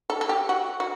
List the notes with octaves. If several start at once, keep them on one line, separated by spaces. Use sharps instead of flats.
A4
A4
G4
F#4
F#4